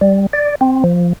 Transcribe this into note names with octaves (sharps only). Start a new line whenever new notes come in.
G3
D5
C4
F3